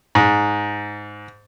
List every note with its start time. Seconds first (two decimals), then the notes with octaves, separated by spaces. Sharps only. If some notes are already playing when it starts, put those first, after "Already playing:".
0.15 G#2